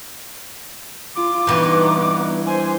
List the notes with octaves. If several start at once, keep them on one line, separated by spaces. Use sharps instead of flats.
F4 D6
G2 E3 B3 D#4
C5 G#5